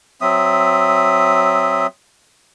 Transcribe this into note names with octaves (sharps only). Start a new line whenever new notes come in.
F#3 C4 E5 D#6